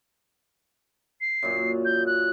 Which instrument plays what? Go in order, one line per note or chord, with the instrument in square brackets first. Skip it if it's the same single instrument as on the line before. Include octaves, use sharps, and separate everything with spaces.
[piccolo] C7
[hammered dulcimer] F#2 A#2
[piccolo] G6
F#6